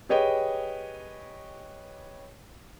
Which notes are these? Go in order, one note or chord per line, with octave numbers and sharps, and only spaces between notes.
G4 G#4 B4 C#5 D#5 G5